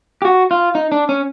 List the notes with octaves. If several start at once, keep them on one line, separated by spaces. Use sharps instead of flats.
G4
F#4
F4
D#4
D4
C#4